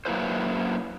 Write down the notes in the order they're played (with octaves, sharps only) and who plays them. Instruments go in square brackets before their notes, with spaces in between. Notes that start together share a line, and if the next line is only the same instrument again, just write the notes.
[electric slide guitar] F#3 A#3 E4 B4 C5